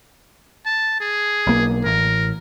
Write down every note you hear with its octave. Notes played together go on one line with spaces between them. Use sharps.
A5
G#4
B1 A#3
A1 A#4